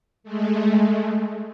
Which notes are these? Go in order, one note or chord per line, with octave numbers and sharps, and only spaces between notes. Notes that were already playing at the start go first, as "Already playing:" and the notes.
G#3 A3